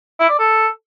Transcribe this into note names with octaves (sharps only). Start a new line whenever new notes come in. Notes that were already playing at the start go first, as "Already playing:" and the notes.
E4
D5
A4